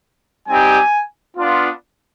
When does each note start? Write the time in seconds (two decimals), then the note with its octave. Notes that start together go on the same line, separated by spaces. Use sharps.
0.47 G3 C4 D#4 G4 G#5
1.37 B3 D4 F4